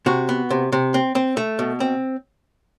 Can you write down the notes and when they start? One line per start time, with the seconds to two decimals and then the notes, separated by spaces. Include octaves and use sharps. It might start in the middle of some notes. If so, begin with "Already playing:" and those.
0.06 C3 F#4
0.29 B3
0.50 C3
0.72 C3
0.94 C4
1.15 C4
1.37 A3
1.59 B2
1.80 C4